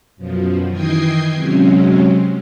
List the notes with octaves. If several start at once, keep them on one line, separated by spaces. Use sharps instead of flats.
F#2 B2 F3
D#3 E3 D#5 G5 G#6 C7
C3 F#3 G#3 C4 C#4